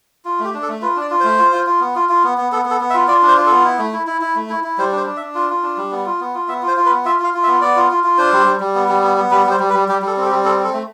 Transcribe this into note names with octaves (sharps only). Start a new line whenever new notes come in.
F4
A3 G4
D4
A4
A3
F4 B4
D4 D5
F4
A3 C5
F4
F4
F4
B3
F4
F4
B3
B3
B3 A4
B3
A4
B3
E5
F4
F4 D5
D4
C5
F4
A4
B3
E4
A3
E4
E4
E4
A3
E4
E4
G3 C5
D4
C5
D4
E5
D4
F4
F4
D4
G3
B3
F4
B3
F4
B3 E5
F4
C5
F4
B4
B3
F4 E5
F4 F5
F4
E5
B3
B3 D5
F4
F4
F4
D4 C5
G3
G3
G3
B3
G3
B3
B3
G3 B4
G3
C5
G3
B4
G3
G3 G4
G3 A4
C4 A4
G4
G3
C4 A4
C4 A4
A3